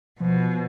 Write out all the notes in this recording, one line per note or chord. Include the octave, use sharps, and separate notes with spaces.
B2 F3